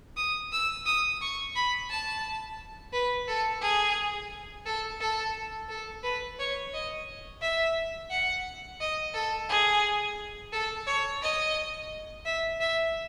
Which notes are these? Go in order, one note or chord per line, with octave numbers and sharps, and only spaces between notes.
D#6
E6
D#6
C#6
B5
A5
B4
A4
G#4
A4
A4
A4
B4
C#5
D#5
E5
F#5
D#5
A4
G#4
A4
C#5
D#5
E5
E5